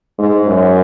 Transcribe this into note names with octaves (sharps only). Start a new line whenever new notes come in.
G#2
F#2